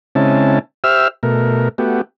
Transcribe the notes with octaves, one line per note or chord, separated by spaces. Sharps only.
C#3 G#3 C4 C#4 E4 A5
G4 C5 E5 E6 F6
B2 A3 A#4
A3 B3 F#4 G4